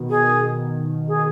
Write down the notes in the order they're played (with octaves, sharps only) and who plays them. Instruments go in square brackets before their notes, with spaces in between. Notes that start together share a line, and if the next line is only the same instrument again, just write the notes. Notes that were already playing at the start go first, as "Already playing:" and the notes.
Already playing: [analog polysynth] B2 D#3
[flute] G#4
G#4